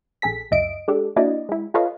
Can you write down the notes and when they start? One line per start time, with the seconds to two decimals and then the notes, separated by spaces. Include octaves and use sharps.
0.22 A#1 G#4 A4 B6
0.51 C#2 F#2 D#5 E5 D7
0.88 G#3 D4 G4 A4
1.16 A#3 D4 E4 F#4 D5 D#5
1.49 G#3 E4
1.74 F4 A4 B4 C#5 D#5 F5